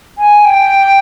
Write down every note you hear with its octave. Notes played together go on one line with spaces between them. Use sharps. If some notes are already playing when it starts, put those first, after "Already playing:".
G#5
G5